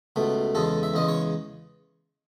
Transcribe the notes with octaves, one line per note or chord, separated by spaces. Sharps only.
C#2 B2 A3
E2 C#3 G#3 A4
E5
E2 C#3 G#3 D#5
C#5